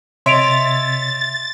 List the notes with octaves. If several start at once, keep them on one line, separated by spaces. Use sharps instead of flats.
C3 C#5 D#5 E5 C6 A6 D7 F7